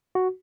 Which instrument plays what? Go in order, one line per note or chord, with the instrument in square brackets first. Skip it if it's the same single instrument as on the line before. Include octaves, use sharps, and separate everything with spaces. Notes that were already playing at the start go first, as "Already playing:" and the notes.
[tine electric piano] F#4